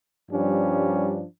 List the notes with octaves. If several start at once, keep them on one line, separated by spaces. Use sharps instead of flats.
G2 F3 G3 C#4 D4